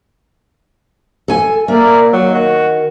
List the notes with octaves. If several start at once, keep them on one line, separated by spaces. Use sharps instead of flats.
A4 G#5
A#3 A#4 D5 E5
D#3 F#3
F#4